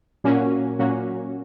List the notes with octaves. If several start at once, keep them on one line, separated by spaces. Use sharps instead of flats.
A#2 F#3 A#3 C#4 F#4
A#2 F#3 A#3 C#4 F#4